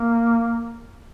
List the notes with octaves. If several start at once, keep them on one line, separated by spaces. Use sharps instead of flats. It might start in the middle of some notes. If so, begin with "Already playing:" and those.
Already playing: A#3